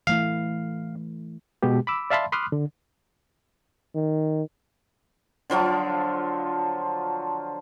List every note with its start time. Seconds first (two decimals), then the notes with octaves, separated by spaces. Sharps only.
0.07 E3 A3 E4 F5
1.63 B2 G#3 B3 G4
1.87 B5 D6 E6
2.10 D5 E5 F5 A5 B5 C6
2.32 B5 C6 D6 D#6 F6 F#6
2.52 D3
3.95 D#3
5.50 D3 F3 F#3 F4